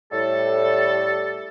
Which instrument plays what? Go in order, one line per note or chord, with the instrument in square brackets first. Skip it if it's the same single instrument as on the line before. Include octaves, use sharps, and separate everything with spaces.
[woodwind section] A2 G3 A4